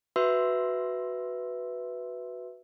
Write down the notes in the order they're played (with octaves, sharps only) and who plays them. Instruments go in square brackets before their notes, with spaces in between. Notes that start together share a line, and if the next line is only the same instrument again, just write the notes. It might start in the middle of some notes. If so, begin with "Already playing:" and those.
[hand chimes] F#4 B4 E5 C6 E6